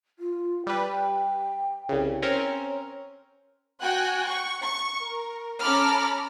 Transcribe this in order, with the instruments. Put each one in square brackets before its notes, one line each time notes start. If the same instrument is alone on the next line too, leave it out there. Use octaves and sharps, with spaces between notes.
[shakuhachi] F4
[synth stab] G3 B4 [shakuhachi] G5
[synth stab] C2 C#3
[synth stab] C4 C#4 A#4 [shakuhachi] C#5
[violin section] F#4 G5 G#5 F#6
C#6
C#6
A#4
C#4 A4 A#5 B5 D6 F6